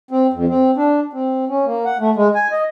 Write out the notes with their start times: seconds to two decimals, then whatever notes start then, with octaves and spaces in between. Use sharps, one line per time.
0.11 C4
0.33 F2
0.48 C4
0.77 D4
1.13 C4
1.49 C#4
1.65 A#3
1.85 F#5
1.99 A3
2.16 G#3
2.35 G#5
2.52 D#5